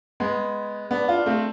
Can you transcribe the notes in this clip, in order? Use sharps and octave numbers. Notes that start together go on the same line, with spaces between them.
G#3 B3
B3 D4
D4 F4
A3 C4